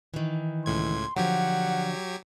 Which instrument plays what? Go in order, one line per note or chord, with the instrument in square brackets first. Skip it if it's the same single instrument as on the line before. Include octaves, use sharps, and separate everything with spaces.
[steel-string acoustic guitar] D#3 E3
[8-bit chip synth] C#2 A2 G#6 [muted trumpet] C6
[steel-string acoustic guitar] D3 F3 [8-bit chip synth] F#3 G4 G#6 [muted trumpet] F#5